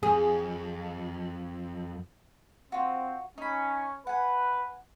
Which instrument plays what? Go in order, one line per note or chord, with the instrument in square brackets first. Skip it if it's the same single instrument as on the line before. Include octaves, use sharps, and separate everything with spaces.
[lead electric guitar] F2 [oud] G#4
[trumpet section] C4 [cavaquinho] F4 F#4
[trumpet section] C#4 [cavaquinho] D#4 B5
[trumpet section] B4 [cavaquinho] F#5 G#5